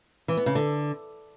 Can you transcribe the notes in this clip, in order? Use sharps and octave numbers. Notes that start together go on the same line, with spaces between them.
E3
B3
C#3
D3